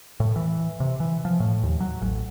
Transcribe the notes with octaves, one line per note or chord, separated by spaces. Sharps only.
A2
E3
C3
E3
F3
A2
D#2
F#3
A1